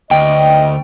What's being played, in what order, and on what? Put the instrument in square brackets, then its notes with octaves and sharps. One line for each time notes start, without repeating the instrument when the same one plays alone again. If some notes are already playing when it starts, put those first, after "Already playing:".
[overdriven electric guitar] D2 [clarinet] D#5 [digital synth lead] G5